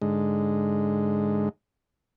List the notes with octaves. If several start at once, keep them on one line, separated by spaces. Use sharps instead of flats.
G#2 D3 G#3